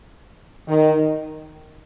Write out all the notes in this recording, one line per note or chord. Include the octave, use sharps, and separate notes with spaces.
D#3